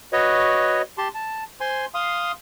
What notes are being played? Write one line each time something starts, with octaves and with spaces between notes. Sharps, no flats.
F#4 B4 C#5 D#5
G4 A5 C6
A5
C5 G#5 C6
F5 C6 D#6